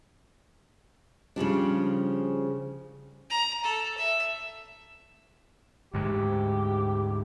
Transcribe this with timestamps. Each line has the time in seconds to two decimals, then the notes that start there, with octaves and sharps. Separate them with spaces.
1.36 C#3 F3 G3 D4
3.30 A#5
3.64 A4
3.98 E5
5.94 D2 G#2 G#3 G4